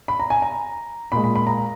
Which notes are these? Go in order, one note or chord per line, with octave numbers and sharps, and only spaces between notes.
B5
A#5
G#5
A#5
A#2 G#3 B5
B5
B5
A#5